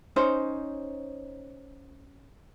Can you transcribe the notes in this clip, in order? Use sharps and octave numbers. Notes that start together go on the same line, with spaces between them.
C#4 D#4 C5